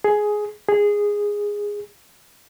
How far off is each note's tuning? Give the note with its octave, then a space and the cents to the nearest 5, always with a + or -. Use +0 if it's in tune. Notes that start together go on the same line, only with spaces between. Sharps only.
G#4 +10
G#4 -10